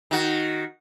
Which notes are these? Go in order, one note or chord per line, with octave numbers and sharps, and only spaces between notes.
D#3 F#4